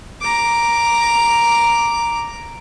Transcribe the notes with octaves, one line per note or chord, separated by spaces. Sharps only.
A#5 D6